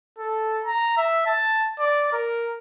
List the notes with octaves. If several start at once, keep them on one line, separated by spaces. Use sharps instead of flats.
A4
A#5
E5
A5
D5
A#4